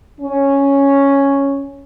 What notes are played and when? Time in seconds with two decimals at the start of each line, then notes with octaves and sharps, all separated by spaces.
0.21 C#4